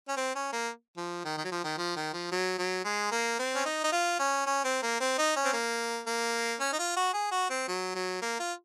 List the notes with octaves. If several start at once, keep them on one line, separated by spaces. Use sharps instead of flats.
C#4
C4
C#4
A#3
F3
D#3
D#3
F#3
F3
D#3
F3
D#3
F3
F#3
F#3
G#3
A#3
C4
C#4
D#4
D#4
F4
C#4
C#4
C4
A#3
C4
D#4
C#4
C4
A#3
A#3
C#4
D#4
F4
F#4
G#4
F#4
C4
F#3
F#3
A#3
F4